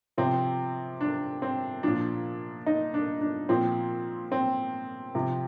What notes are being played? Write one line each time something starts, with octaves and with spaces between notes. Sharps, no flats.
C3 F3 C4
D4
C4
A#2 F3 D4
D#4
D4
D4
A#2 F3 C4
C4
C3 F3